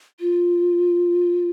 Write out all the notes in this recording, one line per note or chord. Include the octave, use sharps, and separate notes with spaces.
F4